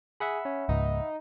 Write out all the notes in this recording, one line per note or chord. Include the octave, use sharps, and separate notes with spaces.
G#4 E5 F#5 B5
C#4
C#2 G#2 D#4